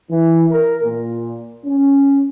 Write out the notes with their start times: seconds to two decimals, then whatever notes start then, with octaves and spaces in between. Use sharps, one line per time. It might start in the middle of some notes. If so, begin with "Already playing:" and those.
0.11 E3
0.50 A#4
0.84 A#2
1.66 C#4